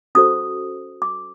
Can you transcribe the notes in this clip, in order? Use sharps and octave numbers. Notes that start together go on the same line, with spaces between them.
C#4 F#4 A4 C5 D#6
D6